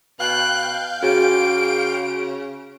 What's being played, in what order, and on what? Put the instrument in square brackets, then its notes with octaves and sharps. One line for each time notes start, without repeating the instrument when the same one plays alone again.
[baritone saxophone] B2 [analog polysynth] F5 G5 G6 [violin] F#6
[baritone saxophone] C#3 [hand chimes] F#4 G#4 [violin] D7